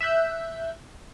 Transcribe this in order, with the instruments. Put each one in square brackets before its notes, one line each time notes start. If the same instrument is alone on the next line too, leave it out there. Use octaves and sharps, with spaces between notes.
[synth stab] E5 E6 F#6 G6